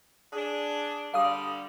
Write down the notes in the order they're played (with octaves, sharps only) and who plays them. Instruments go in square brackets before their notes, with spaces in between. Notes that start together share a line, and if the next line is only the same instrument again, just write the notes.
[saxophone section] D4 G#4
[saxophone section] D3 G3 [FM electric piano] F5 D#6